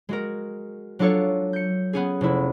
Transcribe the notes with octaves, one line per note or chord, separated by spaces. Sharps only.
G#3 F#4 A#4
F#3 D4 F4 A4 C#5
G6 C#7
B3 C#4 G#4
F1 E4